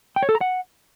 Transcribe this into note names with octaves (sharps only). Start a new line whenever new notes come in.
G5
C#5
A4
A#5
F#5